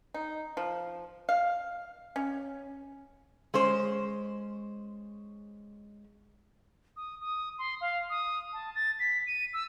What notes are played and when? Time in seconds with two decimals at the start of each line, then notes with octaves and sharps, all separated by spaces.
0.14 D#4
0.57 F3
1.29 F5
2.16 C#4
3.54 G#3 C#4 C5
6.97 D#6
7.21 D#6
7.59 C6
7.81 F5
8.10 D#6
8.53 A5
8.75 A6
8.99 B6
9.27 D#7
9.54 E6